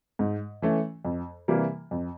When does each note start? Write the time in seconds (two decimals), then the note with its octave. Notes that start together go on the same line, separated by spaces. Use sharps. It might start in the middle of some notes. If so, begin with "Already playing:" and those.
0.19 G#2
0.62 E3 A3 C#4
1.05 F2
1.48 C3 E3 G3 A#3
1.91 F2